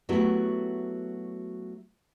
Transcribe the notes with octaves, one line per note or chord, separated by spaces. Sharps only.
F#3 A3 B3 E4 F#4 G4